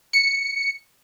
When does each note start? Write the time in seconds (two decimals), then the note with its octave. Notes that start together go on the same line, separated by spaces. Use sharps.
0.13 C#7